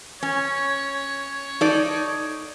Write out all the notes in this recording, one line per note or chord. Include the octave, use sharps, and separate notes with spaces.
C#4 C#5
D#4 A4 D5